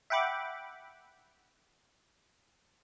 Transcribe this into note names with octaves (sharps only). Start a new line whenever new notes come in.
E5 F#5 G5 B5 D6